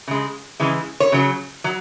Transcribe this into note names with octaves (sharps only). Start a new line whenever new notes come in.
C#3 G#3
C#3 E3 G#3
C#5
C#3 F#3
F#3